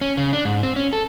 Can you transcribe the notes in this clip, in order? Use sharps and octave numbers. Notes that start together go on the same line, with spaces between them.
C#4
C#3
D4
G#2
C4
C#4
A4